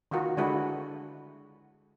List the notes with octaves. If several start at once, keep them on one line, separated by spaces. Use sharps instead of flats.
D#3 D#4 F4 F#4 A#4
D3 G#3 D4 E4 F#4 B4